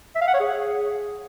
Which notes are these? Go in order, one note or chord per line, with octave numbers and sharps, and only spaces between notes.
E5
F5
F#5
C#5
G#4